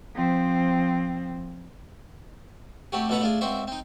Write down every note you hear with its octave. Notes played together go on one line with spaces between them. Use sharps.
F3 C4
A3 C4 F#4 G4
A1 B2 A4 B4 F#5 A#5
A3 D4 F4 G#4
C#2 C4 F#4 C5 E5
C4 D#4